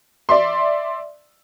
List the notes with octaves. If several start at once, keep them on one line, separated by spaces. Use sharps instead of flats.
D5 E5 C6